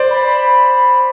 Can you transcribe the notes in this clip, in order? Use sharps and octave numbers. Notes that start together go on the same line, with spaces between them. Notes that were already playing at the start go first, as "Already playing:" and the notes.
Already playing: C5 D5
B5